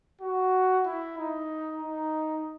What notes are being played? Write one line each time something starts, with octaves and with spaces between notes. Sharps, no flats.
F#4
E4
D#4
D#4